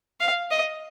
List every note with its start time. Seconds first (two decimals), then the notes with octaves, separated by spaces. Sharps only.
0.20 F5
0.51 D#5